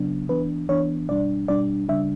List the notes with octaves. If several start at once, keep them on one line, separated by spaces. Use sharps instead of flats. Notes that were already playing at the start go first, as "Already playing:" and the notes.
Already playing: C#3 F#3 B3 D4
E3 B3 D4 B4
E3 B3 D4 C#5
B2 G3 D4 D5
B2 G3 D4 D5
C#3 G3 D4 E5